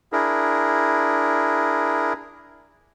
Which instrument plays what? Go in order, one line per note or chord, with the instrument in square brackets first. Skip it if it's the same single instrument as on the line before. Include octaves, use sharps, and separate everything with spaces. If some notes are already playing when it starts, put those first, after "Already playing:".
[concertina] D4 E4 G#4 A#4